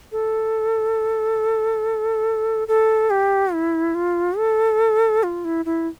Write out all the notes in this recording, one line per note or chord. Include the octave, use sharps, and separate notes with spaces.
A4
A4
G4
E4
F4
A4
F4
E4
E4